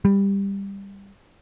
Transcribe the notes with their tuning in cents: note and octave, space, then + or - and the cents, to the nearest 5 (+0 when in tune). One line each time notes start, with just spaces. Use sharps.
G3 +15